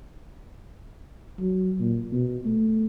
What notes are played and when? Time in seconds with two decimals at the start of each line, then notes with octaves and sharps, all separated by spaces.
1.40 F#3
1.80 A#2
2.12 B2
2.45 A3